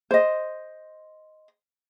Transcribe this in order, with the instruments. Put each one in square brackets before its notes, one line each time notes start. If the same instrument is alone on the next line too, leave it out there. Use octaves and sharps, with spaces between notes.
[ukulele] C5 D#5